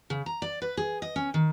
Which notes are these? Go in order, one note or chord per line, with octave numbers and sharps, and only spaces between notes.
C#3
A#5
D5
B4
G#4
D#5
C#4
D#3